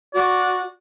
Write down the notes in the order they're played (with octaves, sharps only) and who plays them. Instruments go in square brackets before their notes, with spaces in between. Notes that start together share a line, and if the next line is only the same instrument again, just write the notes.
[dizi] F#4 [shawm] D5